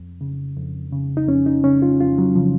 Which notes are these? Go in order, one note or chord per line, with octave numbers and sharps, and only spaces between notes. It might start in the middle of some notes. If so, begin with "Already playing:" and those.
Already playing: F2
C#3
F2
C#3
D#4
F2 C#4
D#4
C#3 C#4
F4
F2 F4
F#3
C#3 F3